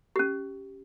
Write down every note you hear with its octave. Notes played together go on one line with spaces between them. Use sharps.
C#4 G4